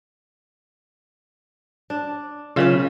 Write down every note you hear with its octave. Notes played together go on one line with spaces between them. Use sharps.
D4
C#3 F#3 C#4 F4 A#4 E5